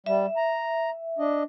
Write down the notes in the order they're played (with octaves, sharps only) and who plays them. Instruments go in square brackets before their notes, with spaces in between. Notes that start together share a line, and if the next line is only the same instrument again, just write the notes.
[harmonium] G3 [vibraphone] E5
[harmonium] A#5
D4 D#5